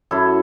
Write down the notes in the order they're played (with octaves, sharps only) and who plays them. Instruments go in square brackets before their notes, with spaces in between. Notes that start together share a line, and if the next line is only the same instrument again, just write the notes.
[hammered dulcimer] F#2 E4 A4